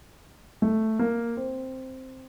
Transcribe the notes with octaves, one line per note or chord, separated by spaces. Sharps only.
A3
A#3
C4